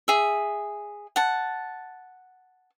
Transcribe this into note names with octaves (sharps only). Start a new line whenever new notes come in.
G#4 E5
F#5 A5